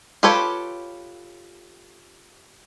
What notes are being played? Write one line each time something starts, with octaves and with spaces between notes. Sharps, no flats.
F4 G4 A4 B4 C#5